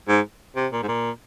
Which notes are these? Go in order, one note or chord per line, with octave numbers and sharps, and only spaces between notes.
G#2
C3
A#2
G#2
A#2